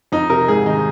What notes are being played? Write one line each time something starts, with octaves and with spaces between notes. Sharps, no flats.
F2 D#4
C3 A#4
G#2 G#4
D#3 D#4